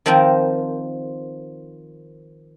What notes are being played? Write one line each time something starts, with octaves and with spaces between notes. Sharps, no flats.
D#3 F3 C4 F4 A#4